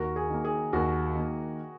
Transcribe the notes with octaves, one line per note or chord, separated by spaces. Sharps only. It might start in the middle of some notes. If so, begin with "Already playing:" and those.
Already playing: D#2 F#4 A#4
G#4
D#3 A#3
G#4
D#2 F#4 A#4
D#3 A#3